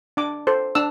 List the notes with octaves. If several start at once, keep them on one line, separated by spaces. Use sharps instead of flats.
D4 D6
A4 C5
D4 E6